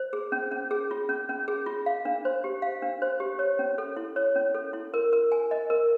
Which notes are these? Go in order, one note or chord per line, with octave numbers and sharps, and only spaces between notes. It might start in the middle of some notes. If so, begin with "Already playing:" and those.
Already playing: C5
G#4
C#4
C#4
G#4
F4
C#4
C#4
G#4
F4
F5
D4
C5
G4
F5
D4
C5
G4
C#5
C#4
A4
E4
C#5
C#4
A4
E4
A#4
A#4
G#5
D#5
A#4